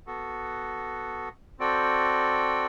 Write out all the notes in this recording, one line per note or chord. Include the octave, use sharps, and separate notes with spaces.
B3 F#4 A4
C4 F#4 A4 D5 G5